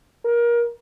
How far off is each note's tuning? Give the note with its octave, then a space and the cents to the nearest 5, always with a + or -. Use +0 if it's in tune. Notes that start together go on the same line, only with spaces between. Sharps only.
A#4 +25